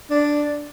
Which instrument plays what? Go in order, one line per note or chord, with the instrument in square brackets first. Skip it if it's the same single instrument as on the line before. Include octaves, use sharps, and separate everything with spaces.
[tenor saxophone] D4